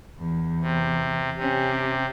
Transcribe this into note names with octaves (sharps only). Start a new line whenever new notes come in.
E2
C3
C3 C#4 G4